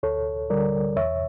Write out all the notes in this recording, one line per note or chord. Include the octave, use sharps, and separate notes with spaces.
D2 A4 C#5
D3 G3 A#4 D5
E2 C#5 E5